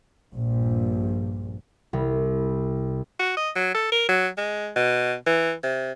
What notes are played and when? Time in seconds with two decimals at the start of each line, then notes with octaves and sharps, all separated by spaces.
0.33 A#1 G2 A#2
1.93 C2
3.19 F#4
3.37 D#5
3.56 F#3
3.74 A4
3.92 A#4
4.09 F#3
4.37 G#3
4.76 B2
5.26 E3
5.64 C3